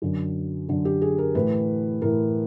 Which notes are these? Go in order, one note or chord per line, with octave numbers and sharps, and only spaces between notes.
F#2 D3
F#2 D3
G4
G#4
A#4
A2 E3 B4
A2 E3 A#4